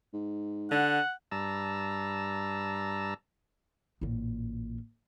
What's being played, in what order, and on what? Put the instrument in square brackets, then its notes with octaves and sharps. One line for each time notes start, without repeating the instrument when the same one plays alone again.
[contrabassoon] G#2
[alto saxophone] D3 [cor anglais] F#5
[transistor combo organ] G2 A5 A#5 E6
[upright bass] A1 A#2